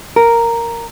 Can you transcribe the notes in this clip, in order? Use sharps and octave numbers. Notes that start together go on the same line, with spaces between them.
A#4